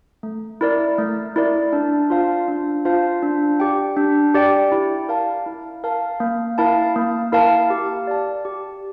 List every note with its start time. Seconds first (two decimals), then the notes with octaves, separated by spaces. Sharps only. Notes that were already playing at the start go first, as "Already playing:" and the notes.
0.23 A3
0.61 E4 A#4 D5
0.98 A3
1.36 E4 A#4 D5
1.73 D4
2.10 F4 C5 F5 A5
2.48 D4
2.85 F4 C5 F5 A5
3.23 D4
3.60 G4 D5 G5
3.97 D4
4.34 G4 D5 G5
4.72 E4
5.09 A#4 F5 A5
5.46 E4
5.84 A#4 F5 A5
6.20 A#3
6.58 E4 A#4 F5 A5
6.96 A#3
7.32 E4 A#4 F5 A5
7.70 G4
8.07 D5 A5
8.45 G4